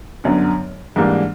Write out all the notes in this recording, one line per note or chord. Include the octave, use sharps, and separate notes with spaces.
G1 F#2 D3
G#2 E3 G3 A#3 D4